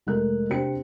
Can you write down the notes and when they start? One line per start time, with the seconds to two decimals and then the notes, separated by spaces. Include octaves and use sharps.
0.06 F1 G#3 A3 A#4 F#6
0.49 C3 D4 C5 G5 C#7